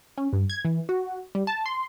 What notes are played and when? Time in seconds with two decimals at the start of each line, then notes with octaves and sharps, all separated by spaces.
0.18 C#4
0.33 G2
0.50 G#6
0.65 E3
0.89 F#4
1.35 G3
1.47 A5
1.66 C6